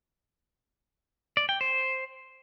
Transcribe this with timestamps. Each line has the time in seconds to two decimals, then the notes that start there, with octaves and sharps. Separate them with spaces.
1.37 D5
1.49 G5
1.61 C5